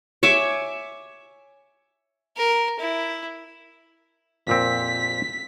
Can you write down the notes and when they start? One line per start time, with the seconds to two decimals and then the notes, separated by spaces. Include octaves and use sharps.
0.23 C#5 E5 G#5 D6
2.37 A#4
2.80 E4
4.47 F2 A#2 C4 B6